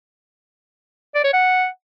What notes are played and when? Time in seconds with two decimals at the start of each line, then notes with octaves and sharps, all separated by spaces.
1.15 D5
1.24 C#5
1.33 F#5